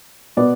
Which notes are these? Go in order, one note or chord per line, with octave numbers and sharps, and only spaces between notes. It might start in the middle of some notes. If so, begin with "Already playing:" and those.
B2 B3 D5